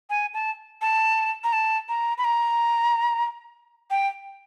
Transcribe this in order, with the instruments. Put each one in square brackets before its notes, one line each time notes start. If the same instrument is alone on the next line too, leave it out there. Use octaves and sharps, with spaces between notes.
[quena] G#5
A5
A5
A#5
A5
A#5
B5
A#5
G5